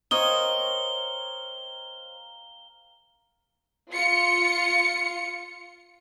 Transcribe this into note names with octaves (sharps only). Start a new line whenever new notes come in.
A#4 C5 C#5 D#5 F5 G5 D#6 G7
F4 C#7